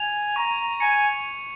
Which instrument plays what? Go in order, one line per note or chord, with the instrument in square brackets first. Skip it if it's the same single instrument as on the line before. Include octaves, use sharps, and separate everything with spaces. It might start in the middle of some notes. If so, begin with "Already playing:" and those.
Already playing: [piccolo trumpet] G#5 [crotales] F7
[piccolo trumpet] A#5 [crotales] C#6
[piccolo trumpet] G#5 [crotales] C#7